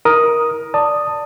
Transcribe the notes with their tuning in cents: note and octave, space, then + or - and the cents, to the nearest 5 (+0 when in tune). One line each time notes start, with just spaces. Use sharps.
E4 -35 A#4 +15 D#6 +0
D5 +0 A5 +20 D#6 -5